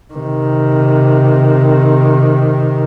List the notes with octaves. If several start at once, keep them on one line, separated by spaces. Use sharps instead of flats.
C3 D#3